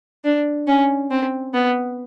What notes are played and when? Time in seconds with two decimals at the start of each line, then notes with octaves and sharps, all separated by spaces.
0.24 D4
0.67 C#4
1.11 C4
1.54 B3